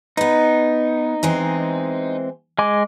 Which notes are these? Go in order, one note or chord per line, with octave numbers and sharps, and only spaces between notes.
B3 D#4 B4
E3 G#3 C4
G#3 G#5 D6